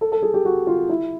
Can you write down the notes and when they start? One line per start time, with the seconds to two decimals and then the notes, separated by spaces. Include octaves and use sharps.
0.01 A4
0.12 A4
0.23 G#4
0.34 G4
0.45 F#4
0.67 F4
0.89 E4